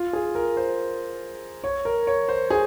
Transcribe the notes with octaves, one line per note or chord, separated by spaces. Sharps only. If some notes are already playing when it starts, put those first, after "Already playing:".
Already playing: F4
G#4
A#4
C5
C#5
A#4
C#5
C5
G#4